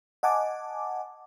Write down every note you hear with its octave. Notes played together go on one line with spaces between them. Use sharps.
D#5 F#5 G#5 A5 D6